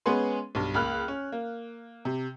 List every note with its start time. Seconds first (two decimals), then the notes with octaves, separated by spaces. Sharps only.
0.06 G#3 B3 C#4 G#4 B4 C6
0.55 B1 G2
0.74 C#2 A#3 B5 F6 F#6
1.08 C#4
1.32 A#3
2.05 C3